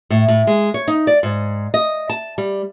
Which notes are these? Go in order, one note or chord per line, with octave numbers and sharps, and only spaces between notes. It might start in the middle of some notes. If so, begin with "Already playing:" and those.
A2
A2
G#3
C#5
D#4
D5
G#2
D#5
A5
G3